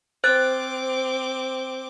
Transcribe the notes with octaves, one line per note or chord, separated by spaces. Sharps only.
C4 C5 D6 F#6 A6